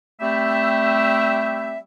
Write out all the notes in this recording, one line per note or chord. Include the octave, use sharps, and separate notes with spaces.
G3 A3 C4 E4 G4 E5